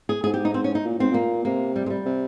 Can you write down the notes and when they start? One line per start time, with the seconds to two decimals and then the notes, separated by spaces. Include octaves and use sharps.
0.09 G#4
0.24 G#2 G#4
0.34 G4
0.45 D#4
0.54 C4
0.64 C#4
0.75 D#4
0.84 A#2
0.98 G#2 C4
1.11 A#2 A#3
1.45 C3 A#3
1.76 G3
1.86 G#3
1.90 G3
2.05 C3